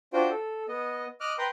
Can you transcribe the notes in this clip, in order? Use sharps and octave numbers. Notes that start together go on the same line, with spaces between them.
D4 F4 F#4 C5 G5
A4
B3 D#5
D#5 D6 F6 F#6
B4 G5 A#5 C6